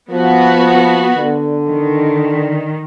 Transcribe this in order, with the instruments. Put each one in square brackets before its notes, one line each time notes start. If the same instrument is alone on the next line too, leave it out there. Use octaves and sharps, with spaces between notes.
[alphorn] F3 [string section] B3 F#4
[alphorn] D3
[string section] D#3